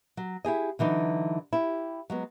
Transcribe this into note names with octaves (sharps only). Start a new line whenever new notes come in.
F#3
E4 G4 G#4 D#5
D3 E3 F#3 D#4
E4 G4
F#3 G#3 B3